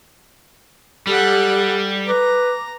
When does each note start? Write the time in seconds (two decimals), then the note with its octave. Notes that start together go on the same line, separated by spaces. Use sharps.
1.07 G3 G4 A4 F#5
2.08 B4 A#5 D6